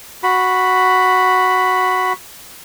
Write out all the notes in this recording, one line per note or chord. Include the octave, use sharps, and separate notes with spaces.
F#4 B5